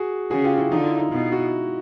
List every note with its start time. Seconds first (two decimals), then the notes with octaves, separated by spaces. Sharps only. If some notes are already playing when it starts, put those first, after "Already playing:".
Already playing: F#4 G#4
0.30 C#3 F#4 G#4
0.44 F4 G4
0.58 E4 F#4
0.71 D3 D#4 F4
0.85 E4
0.98 D#4
1.12 B2 E4
1.32 E4 F#4